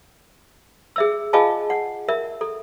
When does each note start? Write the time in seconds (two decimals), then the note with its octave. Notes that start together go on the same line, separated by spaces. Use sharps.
0.96 G#4 E5 E6
1.33 F4 G#4 D#5 F5 G#5 A5
1.70 F#5
2.08 A#4 E5
2.41 A4